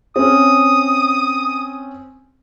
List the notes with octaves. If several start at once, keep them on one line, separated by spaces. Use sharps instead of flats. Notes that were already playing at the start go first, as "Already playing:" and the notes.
C4 C#4 D#6